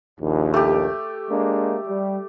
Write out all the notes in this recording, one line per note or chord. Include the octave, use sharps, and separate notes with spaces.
A#1 D#2
A3 G4
G#3 A#3 D4
G3